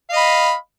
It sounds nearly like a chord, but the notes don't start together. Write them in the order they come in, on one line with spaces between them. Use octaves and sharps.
F5 D#5 B5